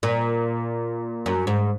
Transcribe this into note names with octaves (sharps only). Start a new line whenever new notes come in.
A#2
F#2
G#2